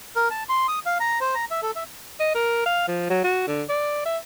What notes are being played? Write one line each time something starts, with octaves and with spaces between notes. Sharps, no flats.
A#4
A5
C6
D#6
F5
A#5
C5
A#5
E5
A4
E5
D#5
A#4
F5
F3
F#3
F#4
D3
D5
E5